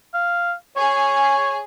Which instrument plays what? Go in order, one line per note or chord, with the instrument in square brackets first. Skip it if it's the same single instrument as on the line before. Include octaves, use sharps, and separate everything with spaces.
[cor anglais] F5
[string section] G#4 [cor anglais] C#5